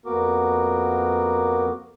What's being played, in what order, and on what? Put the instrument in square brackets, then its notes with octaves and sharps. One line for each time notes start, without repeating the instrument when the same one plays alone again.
[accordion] F2 A#3 B3 F#4 A#4 D6